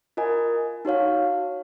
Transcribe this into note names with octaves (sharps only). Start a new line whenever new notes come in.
F4 A#4 D#5 G#5
D#4 F#4 C#5 F5